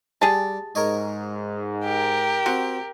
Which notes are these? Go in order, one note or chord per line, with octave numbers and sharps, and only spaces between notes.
G3 G4 G#4 A5
G#2 A#4 C#5 D#5
G4 A#4
C4 F#4